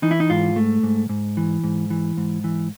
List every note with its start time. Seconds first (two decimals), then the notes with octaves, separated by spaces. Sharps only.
0.02 E3 D#4
0.11 E4
0.20 D#4
0.30 G#2 F4
0.56 A3
0.83 G#2
1.09 G#2
1.37 E3
1.64 G#2
1.90 E3
2.17 G#2
2.44 E3